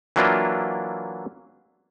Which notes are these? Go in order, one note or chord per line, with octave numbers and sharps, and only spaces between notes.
E3 F#3 A#3 D4 E4 F4